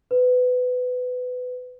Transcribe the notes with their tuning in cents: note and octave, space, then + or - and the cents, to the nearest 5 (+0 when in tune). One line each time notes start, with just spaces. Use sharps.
B4 +20